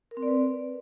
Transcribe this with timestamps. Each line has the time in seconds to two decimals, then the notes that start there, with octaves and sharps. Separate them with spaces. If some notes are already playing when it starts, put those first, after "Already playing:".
0.11 A#4
0.17 C4
0.22 D5
0.28 B4